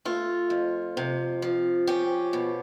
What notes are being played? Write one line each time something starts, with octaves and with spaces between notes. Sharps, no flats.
A3 F4
F2
C3
F3
C#4 G4
B2